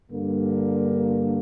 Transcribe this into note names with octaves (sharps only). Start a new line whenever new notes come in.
G2 D3 A#3